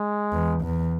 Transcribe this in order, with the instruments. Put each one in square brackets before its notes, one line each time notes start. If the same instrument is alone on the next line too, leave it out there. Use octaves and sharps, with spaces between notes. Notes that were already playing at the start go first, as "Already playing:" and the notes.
Already playing: [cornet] G#3
[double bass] E2
E2